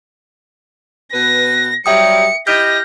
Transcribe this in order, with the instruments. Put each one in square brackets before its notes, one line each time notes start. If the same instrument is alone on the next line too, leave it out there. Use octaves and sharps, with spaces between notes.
[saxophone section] B2 B4 [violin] A#6
[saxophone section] F#3 G3 [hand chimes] E5 G5 D#6 [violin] C#7
[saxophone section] E4 G4 D#5 [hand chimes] F6 G6 [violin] A#6